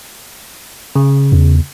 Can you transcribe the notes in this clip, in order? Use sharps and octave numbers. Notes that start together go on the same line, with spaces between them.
C#3
E2